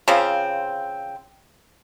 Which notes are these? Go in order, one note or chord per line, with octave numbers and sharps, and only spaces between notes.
C#3 F3 C4